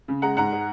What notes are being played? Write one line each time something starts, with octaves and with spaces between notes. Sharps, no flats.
C#3
G#3 F#5 A#5
G#2 F#5 A#5
G#3